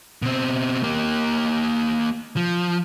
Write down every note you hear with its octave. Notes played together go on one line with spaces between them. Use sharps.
B2 C4
A#3 G4
F3